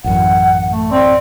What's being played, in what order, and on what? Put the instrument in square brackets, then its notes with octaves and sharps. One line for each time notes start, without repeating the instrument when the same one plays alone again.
[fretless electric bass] A1 F#2 [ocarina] F#5
[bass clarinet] A3
[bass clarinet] C4 [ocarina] D5